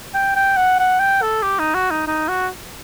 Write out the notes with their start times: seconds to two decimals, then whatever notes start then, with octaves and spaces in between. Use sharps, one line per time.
0.15 G5
0.36 G5
0.57 F#5
0.79 F#5
1.00 G5
1.22 A4
1.43 G4
1.59 D#4
1.75 F#4
1.91 D#4
2.07 D#4
2.29 F#4